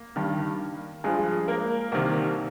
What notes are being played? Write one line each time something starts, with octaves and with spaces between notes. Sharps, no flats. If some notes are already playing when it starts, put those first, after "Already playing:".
Already playing: A#3
G2 D#3
G2 F3 G#3 G#4
A#3 A#4
C2 C3 D#3 A#3 A#4